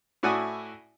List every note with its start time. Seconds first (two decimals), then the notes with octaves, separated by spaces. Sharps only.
0.23 A2 E4 F#4 D5 G#5 D#6